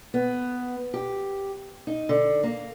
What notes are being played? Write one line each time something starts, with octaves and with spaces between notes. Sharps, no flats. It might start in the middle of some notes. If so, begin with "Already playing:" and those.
B3
G4
D#4
D3
A#3